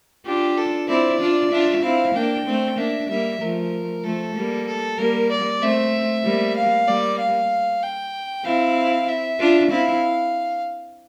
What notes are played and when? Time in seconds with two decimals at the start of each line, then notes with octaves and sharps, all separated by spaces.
0.26 D4 F4 G4
0.57 A4
0.88 C4 E4 D5
1.20 D4 F4
1.51 D4 F4 E5
1.83 C4 E4 F5
2.14 A#3 D4 G5
2.46 A3 C4
2.78 A#3 D4 E5
3.09 G3 A#3 E5
3.41 F3 A3 A#4
4.03 F3 A3 A4
4.35 G3 A#3
4.67 A4
4.98 G3 A#3 A#4
5.31 D5
5.61 A3 C4 E5
6.24 G3 A#3
6.56 F5
6.87 G3 A#3 D5
7.19 F5
7.83 G5
8.45 C4 E4 F5
9.08 E5
9.39 D4 F4
9.71 C4 E4 F5